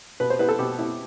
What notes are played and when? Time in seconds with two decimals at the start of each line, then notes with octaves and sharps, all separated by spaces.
0.20 B2 B4
0.30 C5
0.39 B3 E4 B4
0.49 A4
0.59 B2 G4
0.79 B3 E4